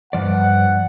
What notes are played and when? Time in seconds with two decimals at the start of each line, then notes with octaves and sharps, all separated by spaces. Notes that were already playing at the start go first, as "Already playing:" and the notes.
0.13 G2 F3 D5 F#5